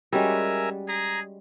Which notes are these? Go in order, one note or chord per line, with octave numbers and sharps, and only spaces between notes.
G3 G#3 C#4 F#4 A#4 E5 G#5
G#4 A#5